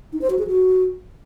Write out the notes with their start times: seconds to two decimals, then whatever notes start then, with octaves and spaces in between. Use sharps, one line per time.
0.13 D#4
0.21 C5
0.30 F#4
0.39 G#4
0.47 F#4